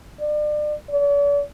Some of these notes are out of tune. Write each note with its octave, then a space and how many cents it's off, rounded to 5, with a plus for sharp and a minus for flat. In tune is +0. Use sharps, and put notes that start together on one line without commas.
D5 +35
D5 -45